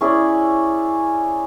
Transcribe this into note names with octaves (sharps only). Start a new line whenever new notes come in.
C#4 E4 G#4 D5